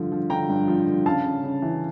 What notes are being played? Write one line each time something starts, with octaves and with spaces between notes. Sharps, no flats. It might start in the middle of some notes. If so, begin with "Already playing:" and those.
Already playing: G2 D3 F3
F3
D3 G5 A#5
G2
F3
D3
C#3 F5 A5
C#3
C#3
E3